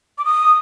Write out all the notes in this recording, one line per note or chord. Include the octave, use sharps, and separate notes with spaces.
D6
D#6